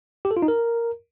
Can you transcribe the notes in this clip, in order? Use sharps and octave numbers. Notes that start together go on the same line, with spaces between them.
G4
A4
F4
D#4
A#4